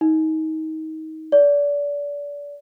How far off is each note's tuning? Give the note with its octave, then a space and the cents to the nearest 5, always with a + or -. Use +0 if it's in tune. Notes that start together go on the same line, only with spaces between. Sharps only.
D#4 +25
D5 -30